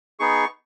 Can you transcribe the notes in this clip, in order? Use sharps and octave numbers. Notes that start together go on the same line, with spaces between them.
B3 D#4 G#4 C#6